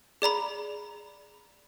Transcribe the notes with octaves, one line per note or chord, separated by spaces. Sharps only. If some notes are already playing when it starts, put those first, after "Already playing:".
G#4 D5 A#5 B5